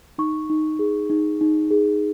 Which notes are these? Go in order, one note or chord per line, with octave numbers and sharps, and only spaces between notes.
D#4 C#6
D#4
G#4
D#4
D#4
G#4